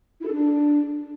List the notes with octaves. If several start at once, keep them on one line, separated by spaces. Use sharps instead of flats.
E4
A4
D4